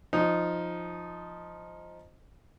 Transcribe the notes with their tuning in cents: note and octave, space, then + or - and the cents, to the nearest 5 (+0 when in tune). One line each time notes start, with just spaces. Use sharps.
F3 +0 D#4 +0